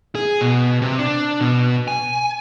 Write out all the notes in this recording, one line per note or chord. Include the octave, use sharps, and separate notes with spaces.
G#4
B2
C3
D4
B2
G#5